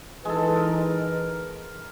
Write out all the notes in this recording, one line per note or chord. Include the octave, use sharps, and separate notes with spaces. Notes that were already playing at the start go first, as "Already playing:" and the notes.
E3 G#3 D#4 A4 B4
A#4